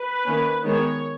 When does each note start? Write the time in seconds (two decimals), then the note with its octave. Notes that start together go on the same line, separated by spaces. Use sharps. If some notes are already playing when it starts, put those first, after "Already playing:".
Already playing: B4
0.26 D#3 A#3 C#4
0.64 D#3 G#3 B3 C#5